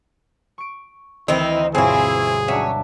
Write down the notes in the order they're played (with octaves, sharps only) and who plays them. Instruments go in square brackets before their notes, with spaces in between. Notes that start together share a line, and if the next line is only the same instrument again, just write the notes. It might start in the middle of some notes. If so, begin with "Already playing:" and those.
[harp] C#6 D7
[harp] D2 E3 C#7 [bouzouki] D#3 C4 D#4 [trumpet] E4
[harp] G2 B2 [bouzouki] C4 E4 [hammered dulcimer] F4 C#5 G#5 [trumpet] G#4
[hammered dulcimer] F#3 D4 [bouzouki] C#4 [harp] E5